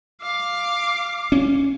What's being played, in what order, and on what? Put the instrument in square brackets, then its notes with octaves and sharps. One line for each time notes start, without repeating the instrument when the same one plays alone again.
[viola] F5 D6
[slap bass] C#4